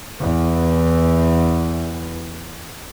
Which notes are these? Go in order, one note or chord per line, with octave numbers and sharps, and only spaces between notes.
E2 E3